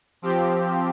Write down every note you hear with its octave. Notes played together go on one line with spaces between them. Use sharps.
F3 C4 G4